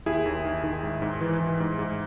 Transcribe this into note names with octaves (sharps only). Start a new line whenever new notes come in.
D#2 E4 G#4
D#2
D#3
D#3
G#2
G#2
E3
E3
G#2
G#2